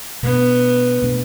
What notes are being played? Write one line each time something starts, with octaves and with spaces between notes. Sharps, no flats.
B2 A3 B3 D4
B2 A3 D4